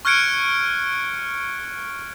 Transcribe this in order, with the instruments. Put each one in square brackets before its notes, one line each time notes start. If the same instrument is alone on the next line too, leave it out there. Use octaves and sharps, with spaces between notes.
[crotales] C#6 F6 F#6 G#6 C#7 D7